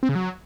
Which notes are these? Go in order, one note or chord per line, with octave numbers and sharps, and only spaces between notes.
C4
C#3
F#3